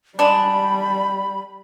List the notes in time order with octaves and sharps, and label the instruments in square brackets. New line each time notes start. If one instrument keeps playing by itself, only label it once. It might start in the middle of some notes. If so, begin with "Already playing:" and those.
[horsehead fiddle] G3 [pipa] G#3 D4 [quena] B5